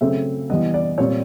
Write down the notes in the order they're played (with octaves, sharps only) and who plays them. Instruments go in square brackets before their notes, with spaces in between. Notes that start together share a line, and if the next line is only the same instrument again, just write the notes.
[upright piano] C#3 F#3 A3 C4 E5
E3 G3 B3 D#5
D5
A#2 G3 C4 C#5